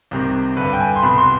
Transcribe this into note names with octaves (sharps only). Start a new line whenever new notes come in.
C2 C3 D#3
G2 D3 B4
G5
G#5
C6
C2 B2 B5
C6